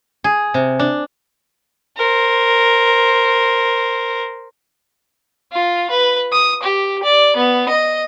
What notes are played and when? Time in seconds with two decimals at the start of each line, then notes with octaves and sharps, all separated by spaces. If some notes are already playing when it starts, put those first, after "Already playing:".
0.24 G#4
0.54 C3
0.79 D4
1.97 A#4 C5
5.52 F4
5.90 B4
6.32 D#6
6.63 G4
7.03 D5
7.36 B3
7.69 D#5